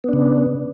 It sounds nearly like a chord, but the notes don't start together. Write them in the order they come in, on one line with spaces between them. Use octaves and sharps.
B3 D4 C#3